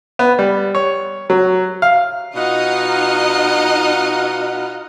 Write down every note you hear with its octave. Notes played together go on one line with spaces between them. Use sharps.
B3
G3
C#5
F#3
F5
B2 D#4 F4 D#5 F#5